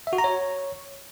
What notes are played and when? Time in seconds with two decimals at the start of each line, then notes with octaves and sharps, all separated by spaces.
0.07 E5
0.13 F#4
0.18 A#5
0.24 C#5